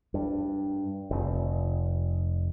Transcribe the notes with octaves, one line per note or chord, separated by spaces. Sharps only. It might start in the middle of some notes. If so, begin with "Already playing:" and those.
G2
F1